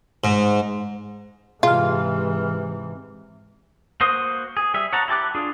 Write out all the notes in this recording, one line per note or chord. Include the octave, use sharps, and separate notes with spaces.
G#2
G#2 C3 E3 F4 G#4 F6
A#3 F#4 C5 C6 D#6
G#4
G3 G#4 E5
C#5 F#5 A5 A#5
E4 G4 A5 D6 F#6
D4 F4 G#4